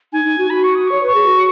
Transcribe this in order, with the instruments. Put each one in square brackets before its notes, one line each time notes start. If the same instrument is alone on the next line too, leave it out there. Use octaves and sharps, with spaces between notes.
[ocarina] D#4 [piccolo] G#5
[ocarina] D#4
F#4
[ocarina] F#4 [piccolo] B5
[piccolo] C#6
D#6
[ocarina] C#5 [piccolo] C#6
[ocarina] B4 [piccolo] C#6
[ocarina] G#4
F#4